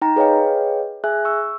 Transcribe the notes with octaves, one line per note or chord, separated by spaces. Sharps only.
D#4 G5 A#5
G#4 B4 C#5 D#5 F5 G5
G#4 E5 G#5 F#6
C#6 E6